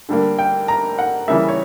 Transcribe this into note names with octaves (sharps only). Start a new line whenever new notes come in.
D3 G3 A#3
G5
A#5
F#5
C#3 E3 G3 A#3 E5
C#5